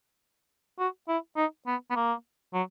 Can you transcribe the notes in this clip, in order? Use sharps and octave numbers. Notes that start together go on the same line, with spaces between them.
F#4
E4
D#4
B3
B3
A#3
F#3